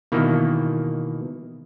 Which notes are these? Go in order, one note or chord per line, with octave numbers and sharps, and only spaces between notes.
B2 D#3 E3 A#3